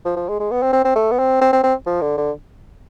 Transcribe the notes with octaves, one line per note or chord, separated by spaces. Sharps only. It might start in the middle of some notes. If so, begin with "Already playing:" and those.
F3
F3
G#3
G#3
B3
C4
C4
C4
A3
B3
C4
C4
C4
C4
F3
D3
D3